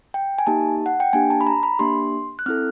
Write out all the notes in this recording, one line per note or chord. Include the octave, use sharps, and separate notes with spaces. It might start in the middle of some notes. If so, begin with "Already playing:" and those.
G5
G#5
A#3 D#4 G4 A5
F#5
G5
A#3 D4 G4 G#5
A5
B5
A#5
B5
A#3 D4 G4 C6
F#6
C4 E4 A4 F6